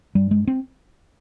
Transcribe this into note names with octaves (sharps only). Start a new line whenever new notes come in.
G2 G3
G#3
C4